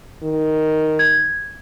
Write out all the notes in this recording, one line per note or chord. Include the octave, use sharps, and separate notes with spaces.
D#3
G#6